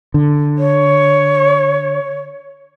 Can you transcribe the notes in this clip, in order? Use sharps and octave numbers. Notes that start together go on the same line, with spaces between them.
D3
C#5